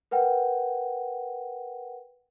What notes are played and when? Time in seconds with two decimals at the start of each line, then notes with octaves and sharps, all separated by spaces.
0.11 A#4 B4 F#5 G5